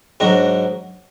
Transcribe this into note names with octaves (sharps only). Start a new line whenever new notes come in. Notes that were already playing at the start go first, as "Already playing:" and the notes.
G#2 F#3 D4 F#4 A#4